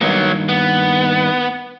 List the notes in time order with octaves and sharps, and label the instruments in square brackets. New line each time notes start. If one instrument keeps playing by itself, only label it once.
[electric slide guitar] G2 D#3 A#3 [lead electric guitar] F#3 B3
[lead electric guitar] B3